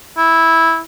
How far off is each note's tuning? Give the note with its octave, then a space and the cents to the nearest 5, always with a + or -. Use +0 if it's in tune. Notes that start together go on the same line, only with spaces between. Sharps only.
E4 -10